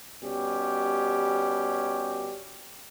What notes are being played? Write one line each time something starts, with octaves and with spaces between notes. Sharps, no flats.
B2 G3 C#4 G4